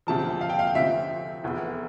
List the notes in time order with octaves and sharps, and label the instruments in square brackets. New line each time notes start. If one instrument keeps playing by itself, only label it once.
[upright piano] E1 D2 C3 F3 A5
F5
G5
F5
D2 C3 F3 C4 E5
F1 E2 E3